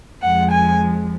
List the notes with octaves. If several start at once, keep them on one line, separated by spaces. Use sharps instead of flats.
F2 F3 G#3 F#5
G#5